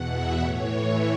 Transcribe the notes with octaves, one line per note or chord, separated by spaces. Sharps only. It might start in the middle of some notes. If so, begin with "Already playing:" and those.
Already playing: E2 B2 F#5
E5
A2 E3 C#5